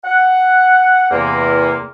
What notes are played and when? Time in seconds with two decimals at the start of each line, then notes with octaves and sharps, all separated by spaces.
0.05 F#5
1.11 E2 C3 A#3